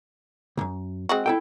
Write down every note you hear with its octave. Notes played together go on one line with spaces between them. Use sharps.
C2 F#2
G#3 C4 F#4
E4 A4 G5